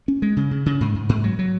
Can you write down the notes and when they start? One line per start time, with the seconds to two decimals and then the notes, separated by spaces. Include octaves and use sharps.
0.08 C#4
0.22 G#3
0.37 C#3
0.51 C#3
0.66 C#3
0.81 G#2
0.95 G#2
1.09 G#2
1.24 F#3
1.39 F#3